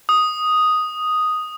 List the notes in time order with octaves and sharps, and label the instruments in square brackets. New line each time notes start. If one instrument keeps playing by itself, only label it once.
[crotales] D#6